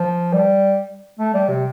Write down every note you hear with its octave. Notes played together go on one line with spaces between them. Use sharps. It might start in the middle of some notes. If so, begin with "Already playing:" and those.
Already playing: F3
G3
A3
G3
C3